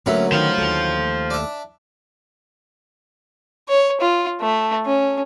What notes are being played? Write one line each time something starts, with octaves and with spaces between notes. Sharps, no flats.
D2 F#3 A#3 C#4 B4 E5
D#3 C#4 C5 F5
D#2 A3
D4 E5
C#5
F4
A3
C#4